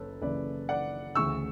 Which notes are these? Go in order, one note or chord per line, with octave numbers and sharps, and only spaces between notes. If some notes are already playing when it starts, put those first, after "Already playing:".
Already playing: F#1 F#2 A4 B4 C#5
F#1 F#2 C#3 E3 B4 D5
D5 F#5
D2 C#3 E3 C#6 E6